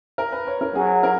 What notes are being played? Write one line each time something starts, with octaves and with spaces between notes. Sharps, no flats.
A#4
B4
C#5
A#4
F#3 G#4
A#4